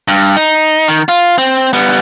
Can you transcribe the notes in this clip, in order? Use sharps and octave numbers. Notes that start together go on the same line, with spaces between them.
G2
D#4
D#3
F4
C4
G3 B3